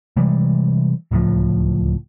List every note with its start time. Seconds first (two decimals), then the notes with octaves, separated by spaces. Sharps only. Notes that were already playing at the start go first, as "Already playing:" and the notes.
0.16 C3 E3 G3 G#3
1.11 D1 C#2 A2 F3